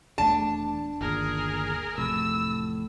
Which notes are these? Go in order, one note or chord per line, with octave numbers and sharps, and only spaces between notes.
D#1 E2 A3 D4 A5
G1 D#2 A#2 G#4 A#4
A1 F2 A2 C3 E6